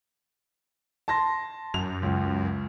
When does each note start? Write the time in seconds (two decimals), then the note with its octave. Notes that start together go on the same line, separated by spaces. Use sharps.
1.08 A5 C6 A#6
1.74 F#2 F7
2.03 C#2